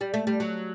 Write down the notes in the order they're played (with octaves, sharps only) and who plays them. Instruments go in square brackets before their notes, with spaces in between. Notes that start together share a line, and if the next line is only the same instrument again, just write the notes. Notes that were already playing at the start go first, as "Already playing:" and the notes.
[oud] G3
A3
G3
F#3